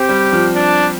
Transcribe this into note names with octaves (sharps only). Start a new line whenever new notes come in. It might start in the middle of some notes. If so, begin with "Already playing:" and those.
Already playing: C4 G4
G3
F3
D4